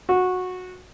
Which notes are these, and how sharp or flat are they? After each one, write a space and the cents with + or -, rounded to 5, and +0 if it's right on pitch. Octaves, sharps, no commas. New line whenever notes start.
F#4 -15